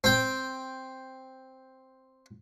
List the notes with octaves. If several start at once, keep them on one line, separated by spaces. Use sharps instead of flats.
C4 G5